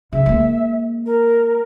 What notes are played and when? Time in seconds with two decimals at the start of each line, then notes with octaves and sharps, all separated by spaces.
0.13 C#3 E5
0.26 G#3 A#3
1.06 A#4